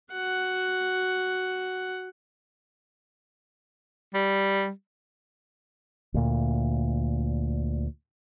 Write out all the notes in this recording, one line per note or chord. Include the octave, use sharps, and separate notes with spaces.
F#4 F#5
G3
D2 A#2